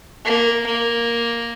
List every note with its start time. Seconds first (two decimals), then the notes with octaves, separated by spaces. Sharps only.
0.25 A#3
0.66 A#3